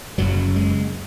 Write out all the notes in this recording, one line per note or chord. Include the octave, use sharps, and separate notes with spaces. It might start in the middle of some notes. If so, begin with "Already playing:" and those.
F#1 F#2 C#3 F#3
G#3